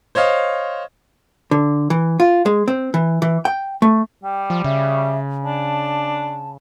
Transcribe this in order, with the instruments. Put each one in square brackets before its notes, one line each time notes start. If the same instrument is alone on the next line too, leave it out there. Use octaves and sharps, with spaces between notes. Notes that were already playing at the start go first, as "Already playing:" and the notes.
[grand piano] C5 C#5 D#5 F5
[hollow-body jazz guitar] D3
E3
F4
G#3
C4
E3
E3
G5
A3
[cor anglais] G3 [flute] G5
[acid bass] F3
[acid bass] C#3 [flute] E5
[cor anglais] D4 [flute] A5